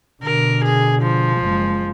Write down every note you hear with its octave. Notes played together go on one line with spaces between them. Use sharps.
B2 D3 A#4
G#4
F3
F#1 G#3